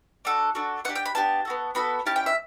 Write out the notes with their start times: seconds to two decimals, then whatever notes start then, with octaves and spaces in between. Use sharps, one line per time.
0.25 D4 F#4 A4
0.55 D4 F#4 A4
0.85 B3 D4 G4 F#5
0.95 G5
1.06 B5
1.15 B3 D4 G4 A5
1.45 B3 F#4 A4
1.75 B3 F#4 A4 B5
2.06 C#4 E4 G4 A5
2.16 G5
2.26 E5